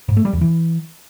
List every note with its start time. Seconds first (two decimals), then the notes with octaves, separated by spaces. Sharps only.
0.08 G#2
0.17 A3
0.25 G3
0.33 E2
0.41 E3